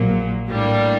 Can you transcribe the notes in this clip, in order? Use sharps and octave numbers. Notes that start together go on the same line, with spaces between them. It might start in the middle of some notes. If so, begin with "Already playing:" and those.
Already playing: A#1 A#2 F#3 A#3
A2 G3 A#3 D4